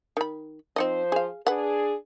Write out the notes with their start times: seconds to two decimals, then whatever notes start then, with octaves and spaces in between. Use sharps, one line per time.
0.17 D#3 B5
0.76 F3 C4 D#4 C5 D#5
1.12 G#4 F5
1.47 D4 G#4 B4 F#5